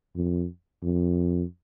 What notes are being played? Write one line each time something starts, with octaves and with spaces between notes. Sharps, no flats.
F2
F2